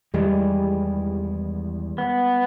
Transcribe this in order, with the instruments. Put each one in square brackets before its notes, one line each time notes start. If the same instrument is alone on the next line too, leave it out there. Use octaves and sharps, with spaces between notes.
[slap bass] E2 D#3 E3 [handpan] G3 G#3
[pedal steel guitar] B3